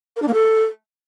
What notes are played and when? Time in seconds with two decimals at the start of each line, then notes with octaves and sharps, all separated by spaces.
0.16 A#4
0.22 D4
0.27 A#3
0.33 A4